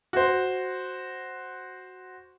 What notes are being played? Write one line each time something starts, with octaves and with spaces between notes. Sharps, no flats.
F#4 C5